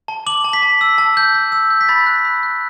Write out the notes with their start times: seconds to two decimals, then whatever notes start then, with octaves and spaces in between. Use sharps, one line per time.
0.08 A5
0.26 D6 F#7
0.44 A5
0.53 B6
0.62 A5
0.81 E6
0.98 A5
1.17 G6
1.34 G6
1.52 E6
1.70 G6
1.81 B6
1.89 B5 A6
2.06 F#6
2.25 B5
2.43 F#6